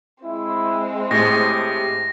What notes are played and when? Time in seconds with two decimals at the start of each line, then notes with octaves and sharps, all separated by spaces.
0.24 G#3 C4 E4
1.11 A2 A3 G4 G#4 A#6